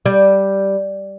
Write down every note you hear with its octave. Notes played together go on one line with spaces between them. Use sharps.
G3